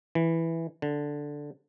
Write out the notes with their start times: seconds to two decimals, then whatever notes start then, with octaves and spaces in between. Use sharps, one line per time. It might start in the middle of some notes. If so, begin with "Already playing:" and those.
0.15 E3
0.82 D3